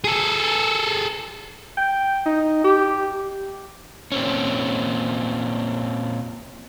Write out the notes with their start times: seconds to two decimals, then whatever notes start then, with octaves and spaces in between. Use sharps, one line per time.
0.04 G#4 A4
1.77 G5
2.26 D#4
2.64 G4
4.12 A#2 C4 C#4